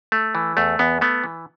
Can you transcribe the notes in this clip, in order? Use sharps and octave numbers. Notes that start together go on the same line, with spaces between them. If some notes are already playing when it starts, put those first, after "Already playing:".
A3
E3
E2 A3
E2 B3
A3 B3
E3